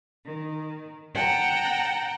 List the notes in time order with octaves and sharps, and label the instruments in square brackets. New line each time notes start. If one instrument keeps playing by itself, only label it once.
[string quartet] D#3
F#5 G5 A5 A#5